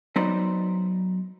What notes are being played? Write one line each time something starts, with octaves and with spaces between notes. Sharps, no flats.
F#3 B3 D#4 C5 D5 D#5